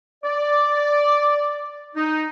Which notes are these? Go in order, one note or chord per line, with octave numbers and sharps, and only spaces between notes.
D5
D#4